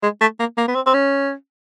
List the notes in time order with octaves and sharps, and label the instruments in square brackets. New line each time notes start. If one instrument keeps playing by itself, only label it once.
[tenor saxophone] G#3
A3
A#3
A#3
B3
C4
C4
C#4